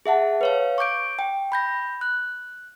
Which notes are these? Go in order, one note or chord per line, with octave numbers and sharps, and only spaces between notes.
G#4 E5 F#5 A5
B4 C#5 F5
C#6 D6 G6 D7
G5
B5 G6 A#6
F#6